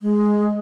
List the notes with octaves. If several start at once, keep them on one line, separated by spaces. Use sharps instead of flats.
G#3